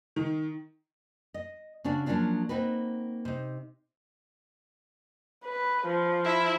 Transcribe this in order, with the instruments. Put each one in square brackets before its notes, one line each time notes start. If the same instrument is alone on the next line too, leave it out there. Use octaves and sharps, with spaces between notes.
[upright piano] D#3
[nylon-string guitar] D#5
C#3 C#4 D4 F#4
F3 F#3 A#3 C#4 D4 F4
A#3 C4 D#4 F#4 B4
C3 D#4
[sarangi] B4
F3
[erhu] E4